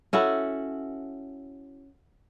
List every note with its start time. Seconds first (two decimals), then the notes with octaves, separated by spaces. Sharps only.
0.13 C#4 E4 F#4 A4